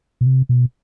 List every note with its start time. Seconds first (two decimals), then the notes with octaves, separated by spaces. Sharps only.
0.21 B2
0.26 C3
0.49 B2